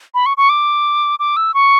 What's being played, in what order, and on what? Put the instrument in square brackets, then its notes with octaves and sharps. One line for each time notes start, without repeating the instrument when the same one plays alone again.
[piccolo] B5
C#6
C#6
D6
D6
E6
C#6